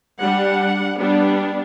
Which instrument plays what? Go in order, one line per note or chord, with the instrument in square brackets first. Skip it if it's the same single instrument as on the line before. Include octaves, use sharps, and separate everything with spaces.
[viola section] G3 D4 F#5
G3 B3 D4